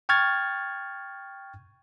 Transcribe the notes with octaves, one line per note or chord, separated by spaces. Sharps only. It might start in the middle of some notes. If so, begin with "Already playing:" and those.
G5 C#6 F6 G#6 A6